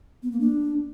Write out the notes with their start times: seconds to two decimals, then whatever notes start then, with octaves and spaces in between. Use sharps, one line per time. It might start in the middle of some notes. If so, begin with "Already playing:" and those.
0.23 B3
0.32 A#3
0.40 D4